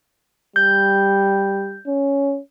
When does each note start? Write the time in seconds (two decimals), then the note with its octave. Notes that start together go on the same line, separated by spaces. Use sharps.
0.56 G3 G6
1.87 C#4